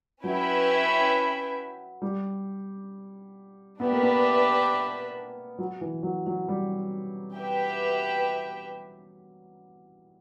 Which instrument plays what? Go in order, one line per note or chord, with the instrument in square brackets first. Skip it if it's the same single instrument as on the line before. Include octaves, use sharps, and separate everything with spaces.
[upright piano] F#3 [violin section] C#4 E4 B4 E5 G5
[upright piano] G3
[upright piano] B3 [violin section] D4 G4 B4 E5
[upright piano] A#3
B3
F#3
E3
F#3
F#3
G3
[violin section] G4 B4 E5 G5